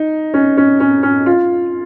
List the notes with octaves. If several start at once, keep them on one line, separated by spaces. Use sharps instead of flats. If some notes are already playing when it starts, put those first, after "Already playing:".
Already playing: D#4
C#4
C#4
C#4
C#4
F4